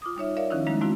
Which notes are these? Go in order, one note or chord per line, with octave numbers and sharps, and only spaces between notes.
F4 D6 D#6
G3 D#4 C#5 E5
A#4 C#5 D5 E5 F5
D#3 F3 C#4 D#4 E4
F3 G3 G#3 A#3 D#4
G#3 A3 C4 E4 F#4